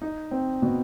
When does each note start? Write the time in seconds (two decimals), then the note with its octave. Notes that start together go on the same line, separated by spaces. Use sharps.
0.02 D#4
0.31 C4
0.62 B2